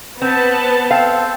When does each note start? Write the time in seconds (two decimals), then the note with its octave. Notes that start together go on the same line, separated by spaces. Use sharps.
0.22 B3 C4 A5
0.91 C4 A4 C5 F5